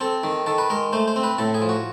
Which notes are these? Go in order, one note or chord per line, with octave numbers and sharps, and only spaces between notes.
C4 A4
D#3
D#3 A4
B4
G#3 A#4
A3 C5
C5
C4
B4
A2 A4
G#4
F3
F#4